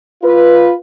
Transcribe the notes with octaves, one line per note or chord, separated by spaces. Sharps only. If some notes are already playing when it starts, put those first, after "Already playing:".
F4 B4